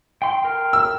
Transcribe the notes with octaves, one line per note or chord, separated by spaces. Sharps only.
G5 C6
A#4 G5
E6